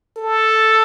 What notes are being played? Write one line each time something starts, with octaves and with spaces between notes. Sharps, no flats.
A4